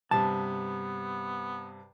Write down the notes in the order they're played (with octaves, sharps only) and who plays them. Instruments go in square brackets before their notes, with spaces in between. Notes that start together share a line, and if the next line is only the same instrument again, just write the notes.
[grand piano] G2 C3 [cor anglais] B3 [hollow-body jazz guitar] A5